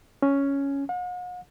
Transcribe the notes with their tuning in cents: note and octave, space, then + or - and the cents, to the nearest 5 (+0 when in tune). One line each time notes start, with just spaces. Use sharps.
C#4 +5
F#5 -45